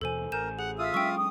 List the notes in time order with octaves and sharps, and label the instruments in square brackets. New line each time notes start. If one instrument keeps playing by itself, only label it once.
[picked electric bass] D#2 B2 E3 [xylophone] A4 C5 G#5
[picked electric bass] A1 [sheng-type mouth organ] A#4 [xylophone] G#5 G6 E7
[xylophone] G#4 [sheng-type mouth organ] F#5
[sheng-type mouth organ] F4 D#6 [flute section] E5 E6
[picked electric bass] F#3 G#3 C#4 [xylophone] G5 C#6
[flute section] D#6